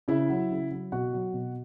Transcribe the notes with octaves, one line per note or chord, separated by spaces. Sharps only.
C#3 E4 E5
F#3
C#3
F#3
B2 F#4 F#5
F#3
B2